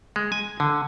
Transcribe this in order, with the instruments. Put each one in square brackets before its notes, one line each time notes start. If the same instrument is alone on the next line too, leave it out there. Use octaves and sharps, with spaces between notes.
[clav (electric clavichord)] G#3
G#5
D3